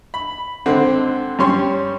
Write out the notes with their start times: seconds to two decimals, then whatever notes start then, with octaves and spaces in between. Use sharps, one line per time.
0.14 B5
0.66 G#1 D3 C4
1.39 G2 G3 C#4 C#5 C6